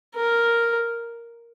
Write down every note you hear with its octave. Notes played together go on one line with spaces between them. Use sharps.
A#4